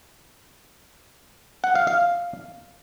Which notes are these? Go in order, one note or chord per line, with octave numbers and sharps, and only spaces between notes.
F#5
F5
F5